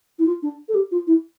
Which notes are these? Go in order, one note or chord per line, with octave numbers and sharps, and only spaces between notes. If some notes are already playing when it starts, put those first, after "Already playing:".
E4
F4
D4
A4
G4
F4
E4